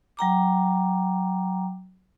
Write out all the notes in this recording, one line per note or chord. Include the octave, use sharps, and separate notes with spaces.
F#3 G5 A#5 D6